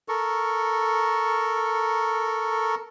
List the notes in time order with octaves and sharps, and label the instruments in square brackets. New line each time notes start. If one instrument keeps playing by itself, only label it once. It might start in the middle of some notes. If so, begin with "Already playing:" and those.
[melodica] A4 A#4 C#6